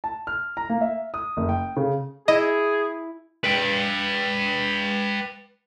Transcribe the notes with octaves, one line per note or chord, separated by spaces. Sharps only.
A5
F6
A#5
A#3
E5
D#6
F#1
G5
C#3
E4 G#4 D#5
B4 G5